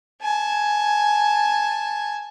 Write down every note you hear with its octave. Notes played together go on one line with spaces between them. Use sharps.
G#5 A5